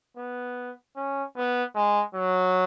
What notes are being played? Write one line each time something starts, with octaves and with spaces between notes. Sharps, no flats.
B3
C#4
B3
G#3
F#3